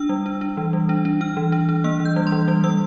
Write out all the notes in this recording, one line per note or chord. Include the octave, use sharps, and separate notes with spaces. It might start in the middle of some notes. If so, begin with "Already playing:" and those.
Already playing: D4 E6
G3
D4
D4
E3
G3
D4
D4
D4 F6
E3
D4
D4
A#3 E6
E3
G6
G3
C6
E3
G3
G3 E6